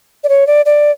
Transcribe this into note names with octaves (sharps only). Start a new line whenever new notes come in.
D5
C#5
D5
D5